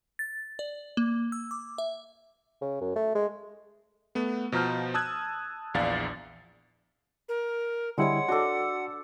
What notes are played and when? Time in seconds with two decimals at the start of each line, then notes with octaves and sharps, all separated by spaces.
0.19 A6
0.59 D5
0.97 A#3
1.32 E6
1.51 D6
1.78 E5
2.61 C#3
2.81 F#2
2.95 A3
3.15 G#3
4.15 A3 B3
4.52 B2 F3 A#5 F6 G6
4.94 A5 D#6 E6 F#6 G#6
5.74 A#1 E2 D5 F5 A6
7.29 A#4
7.98 D3 G3 G#3 E4 C#5 F#5
8.29 D4 F#4 A4 C6 D6